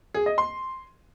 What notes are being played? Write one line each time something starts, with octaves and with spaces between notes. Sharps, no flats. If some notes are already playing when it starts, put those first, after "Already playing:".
G#4
D#5
C6